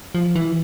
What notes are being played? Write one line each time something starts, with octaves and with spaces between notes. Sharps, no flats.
F3
E3